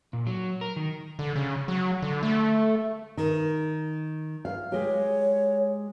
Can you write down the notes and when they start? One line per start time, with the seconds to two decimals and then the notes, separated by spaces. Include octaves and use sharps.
0.13 A#2
0.27 F#3
0.61 A#4
0.76 D#3
1.19 D3
1.36 C#3
1.68 F#3
2.02 D3
2.23 A3
3.17 D#3
4.45 F5
4.72 G#3 G4 C#5